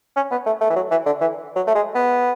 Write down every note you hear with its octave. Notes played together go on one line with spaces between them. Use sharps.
C#4
B3
A3
A3
E3
F#3
E3
D3
E3
F#3
A3
G#3
B3